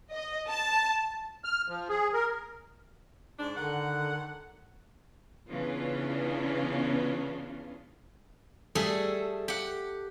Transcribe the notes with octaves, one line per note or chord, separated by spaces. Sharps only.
D#5
A5
F6
F3
G#4
A#4
G#2 D4
D3 D#3 F#5
C#3 E3 B3 C#4 D4 F4
G3 A3 G#4 A4
G4 F#5